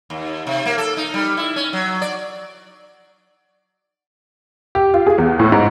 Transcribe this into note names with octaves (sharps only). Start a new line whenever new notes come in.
D#2
C3
A#3
A4
D#4
G3
E4
C#4
F#3
D5
G4
F4
G#4
E2
A2
G#2